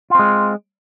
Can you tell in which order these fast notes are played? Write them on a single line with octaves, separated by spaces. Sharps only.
F4 C4 G#3